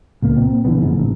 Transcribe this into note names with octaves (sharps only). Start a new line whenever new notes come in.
C#2 A#2 A#3 B3
A#2 C4
D3 E3 G3 B3
F#1 F2 G#2
A1